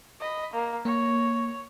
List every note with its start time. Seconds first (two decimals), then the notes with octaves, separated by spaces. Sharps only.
0.20 D#5 B5
0.53 A#3
0.85 A#3 C#5